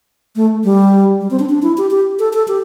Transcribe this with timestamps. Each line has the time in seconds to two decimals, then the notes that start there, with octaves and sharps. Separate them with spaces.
0.36 A3
0.64 G3
1.21 G3
1.31 C4
1.39 D4
1.49 D4
1.63 E4
1.78 G4
1.91 G4
2.19 A4
2.33 A4
2.48 G4